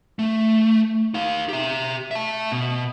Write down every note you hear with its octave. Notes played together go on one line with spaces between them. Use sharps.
A3
D#4 F5
G4 E5
E5 A5
B2